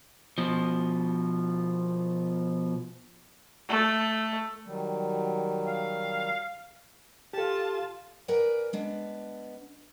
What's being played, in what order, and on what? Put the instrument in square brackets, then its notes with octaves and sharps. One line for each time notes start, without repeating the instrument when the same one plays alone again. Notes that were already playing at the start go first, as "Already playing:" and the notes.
[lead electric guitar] B2 F3
[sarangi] A3
[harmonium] D#3 F#3 G3
[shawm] F5
[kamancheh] F4 A5 [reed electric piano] G4 A4
[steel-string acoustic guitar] A#4 B4 D5 F#5 G#5
G#3 B3 D4